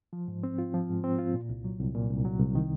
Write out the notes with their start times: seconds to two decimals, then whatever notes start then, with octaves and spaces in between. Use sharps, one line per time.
0.13 F3
0.28 G#2
0.43 C4
0.58 F4
0.74 F3
0.89 G#2
1.04 C4
1.19 F4
1.34 A#2
1.49 C2
1.64 F#3
1.79 C2
1.94 A#2
2.10 C2
2.25 F#3
2.40 C2
2.55 D#3